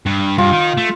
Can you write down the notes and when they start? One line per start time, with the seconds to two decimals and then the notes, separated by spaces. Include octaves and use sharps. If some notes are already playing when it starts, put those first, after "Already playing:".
0.06 G2
0.38 G2 F4
0.52 D#3
0.77 A3